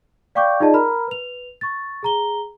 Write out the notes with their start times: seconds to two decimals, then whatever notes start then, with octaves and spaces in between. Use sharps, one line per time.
0.35 D5 F5 G5 C#6 D6 G6
0.60 D#4 F4 G#4 D5 D#5 A5
0.73 A#4 A#5 B5 F6
1.08 B4 F7
1.61 C#6 A6
2.03 G#4 A#5 G7